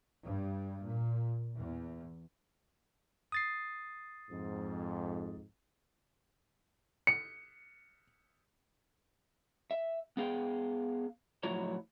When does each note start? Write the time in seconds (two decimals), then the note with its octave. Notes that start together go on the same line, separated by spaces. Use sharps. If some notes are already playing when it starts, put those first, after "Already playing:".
0.24 G2
0.86 A#2
1.54 E2
3.32 D#6 A6 C7
4.30 F2 G#2
7.07 C#7
9.71 E5
10.17 B3 G#4 F5 G5
11.43 A2 F3 F#3 E4 C#5 A#5